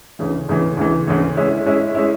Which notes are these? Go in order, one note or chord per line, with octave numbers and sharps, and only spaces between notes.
D2 C#3 E3
D2 C#3 E3
D2 C#3 E3
D2 C#3 E3
G#3 C#4 E4
G#3 C#4 E4
G#3 C#4 E4